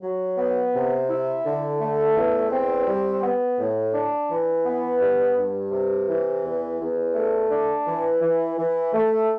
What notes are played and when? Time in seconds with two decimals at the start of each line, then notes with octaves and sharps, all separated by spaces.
0.01 F#3
0.37 B3
0.74 C3
1.09 E4
1.45 D3
1.80 A3
2.16 E2
2.52 C4
2.87 G3
3.22 B3
3.59 A2
3.94 D4
4.29 E3
4.65 B3
5.01 G2
5.37 G2
5.72 C3
6.08 E3
6.43 E2
6.80 E2
7.15 A3
7.51 D4
7.86 E3
8.21 E3
8.58 E3
8.93 A3